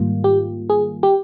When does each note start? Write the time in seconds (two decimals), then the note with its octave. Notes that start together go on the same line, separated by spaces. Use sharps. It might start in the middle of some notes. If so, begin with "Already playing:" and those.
Already playing: G#2 D#3 G3 A#3 F4
0.24 G4
0.69 G#4
1.03 G4